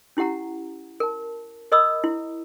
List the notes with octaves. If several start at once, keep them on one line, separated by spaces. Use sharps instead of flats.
C#4 E4 G4 F#5 A#5
A#4 A5
A#4 C#5 D#5 B5 D#6 E6
E4